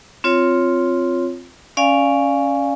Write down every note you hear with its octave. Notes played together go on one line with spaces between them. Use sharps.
C4 F4 C#5
C#4 D5 F5 G#5